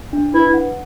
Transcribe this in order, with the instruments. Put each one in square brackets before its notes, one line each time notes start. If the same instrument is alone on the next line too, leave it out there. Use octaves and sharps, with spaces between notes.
[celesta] D4
[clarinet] E4 [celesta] B4
[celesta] F#5